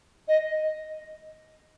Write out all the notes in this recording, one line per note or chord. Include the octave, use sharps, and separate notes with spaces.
D#5